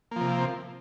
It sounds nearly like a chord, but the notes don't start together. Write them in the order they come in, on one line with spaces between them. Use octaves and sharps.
A#3 F3 C3